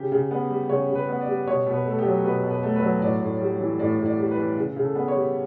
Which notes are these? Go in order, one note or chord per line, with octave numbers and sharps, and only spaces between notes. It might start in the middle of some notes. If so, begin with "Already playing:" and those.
Already playing: C#3 G4
C#3
B3
G3
C#3 C#5
C#3
B4
B3
D5
G3
B2 C#5
B2
B4
A3 A4
G4
F#3
B2 B4
B2
B4
A3
B4
F#3
A2 D5
A2
G3
E3
A2 D5
A2
D5
G3
B4
E3
C#3
C#3
A4
B3
C#5
G3